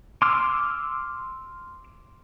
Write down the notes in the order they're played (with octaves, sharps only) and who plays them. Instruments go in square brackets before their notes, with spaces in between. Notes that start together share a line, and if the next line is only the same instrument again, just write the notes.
[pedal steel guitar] C6 D6 E6 F6